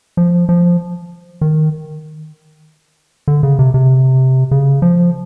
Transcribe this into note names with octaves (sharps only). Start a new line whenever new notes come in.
F3
F3
D#3
D3
C#3
C3
C3
C#3
F3